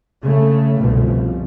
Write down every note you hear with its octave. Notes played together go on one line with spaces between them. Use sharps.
C#3 A3
G1 C2 B2 F3